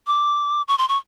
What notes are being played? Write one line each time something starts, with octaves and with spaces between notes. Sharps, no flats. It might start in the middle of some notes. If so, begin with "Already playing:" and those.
D6
C#6
C6
C#6